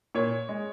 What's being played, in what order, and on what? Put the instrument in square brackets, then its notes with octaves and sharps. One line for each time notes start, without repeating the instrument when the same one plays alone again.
[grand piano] A#2 C#5
G#3